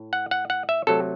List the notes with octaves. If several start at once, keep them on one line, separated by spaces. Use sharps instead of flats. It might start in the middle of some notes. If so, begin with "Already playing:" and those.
Already playing: A2
F#5
F#5
F#5
E5
C3 F#3 A3 A4